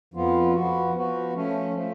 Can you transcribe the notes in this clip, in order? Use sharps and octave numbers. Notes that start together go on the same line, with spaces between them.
F2 F3 B3 F4
F3 B3 F#4
F3 B3 F#4
F3 A3 C#4
F3 A3